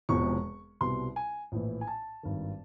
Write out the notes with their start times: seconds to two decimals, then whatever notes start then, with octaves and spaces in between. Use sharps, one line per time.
0.09 E1 E2 C3 F3 G#3 C#6
0.81 C2 B2 G3 C6
1.16 G#5
1.52 A#1 A2 E3
1.81 G#5
1.87 A5
2.23 G#1 G2 D#3